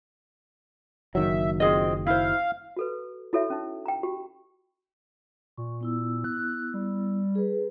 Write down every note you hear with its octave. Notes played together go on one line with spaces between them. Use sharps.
F#1 D#3 F#3 E5
C4 F4 G#4 D#5
E4 C5 F5
F#4 A4 B4
E4 F#4 A4 C#5 E5
C#4 D#4
G5 A#5
F#4 G4
A#2 C#6
B3 E4 E6
F#6
G3
G#4 B4